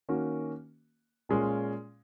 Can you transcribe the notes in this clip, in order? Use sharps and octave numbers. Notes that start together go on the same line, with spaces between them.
D#3 A#3 C#4 F#4
A#2 G#3 C#4 F4